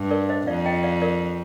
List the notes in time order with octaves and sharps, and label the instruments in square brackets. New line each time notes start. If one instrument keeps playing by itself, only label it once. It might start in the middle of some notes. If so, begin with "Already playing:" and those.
Already playing: [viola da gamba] G2
[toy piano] A#4 D5
C5 D#5
[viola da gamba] F2 [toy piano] D5 F5
[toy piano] D#5 G5
D5 F5
A#4 D5